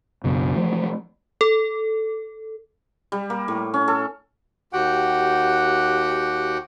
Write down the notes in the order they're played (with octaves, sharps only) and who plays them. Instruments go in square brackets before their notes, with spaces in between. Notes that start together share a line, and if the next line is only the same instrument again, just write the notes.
[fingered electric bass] B1 F#2 C#3 B3
E3 F3 A3
[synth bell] A4
[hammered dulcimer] G3
A#3
A2
C#4
A4
[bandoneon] D#2 F#4 G4 F#5 G5